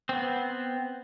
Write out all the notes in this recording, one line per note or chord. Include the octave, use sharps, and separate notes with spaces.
B3 C4